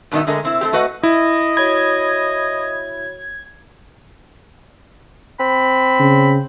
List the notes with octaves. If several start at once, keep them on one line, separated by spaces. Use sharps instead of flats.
G2 B2 D#3 B3 D#4 E5
D3 G#3 A3 A#4 D#5
C3 C4 E4
A3 C4 G4
A3 F#4 B4 D#5 F#5
E4 D#5
F#4 C#5 B5 G#6
C4 B5
C#3